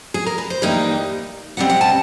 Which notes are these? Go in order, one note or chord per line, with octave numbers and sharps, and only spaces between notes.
G#4
A#4
B4
C5
G2 E3 G3 A#3 D#4
B2 G3 C4 F#5
F#5
A5